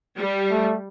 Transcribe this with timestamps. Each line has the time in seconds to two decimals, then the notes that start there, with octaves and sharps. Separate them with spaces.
0.18 G3
0.51 A3